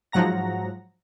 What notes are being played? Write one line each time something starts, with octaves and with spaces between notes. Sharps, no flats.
G#2 F3 F#3 F#5 A#5 A#6